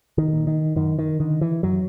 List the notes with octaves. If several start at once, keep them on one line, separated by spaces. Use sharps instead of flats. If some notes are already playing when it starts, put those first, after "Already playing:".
D#3
A#2
D#3
F#2 D#3
D#3
D3 D#3
E3
F#2 F#3